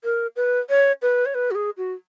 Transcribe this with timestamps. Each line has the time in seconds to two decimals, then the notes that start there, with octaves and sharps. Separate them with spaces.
0.04 A#4
0.36 B4
0.69 C#5
1.02 B4
1.25 C#5
1.34 B4
1.51 F#4
1.55 G#4
1.77 F#4